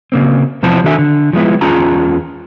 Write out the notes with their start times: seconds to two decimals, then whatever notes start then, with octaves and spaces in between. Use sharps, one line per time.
0.12 C#3 A#3 C4
0.63 E2 C3 F3 E4 C5 A5
0.84 D#3 D4 F#4 A4 E5 G#5
0.98 D3
1.33 F3 G#3 B3 E4
1.61 E2 C#4 F4 G#4 A5 A#5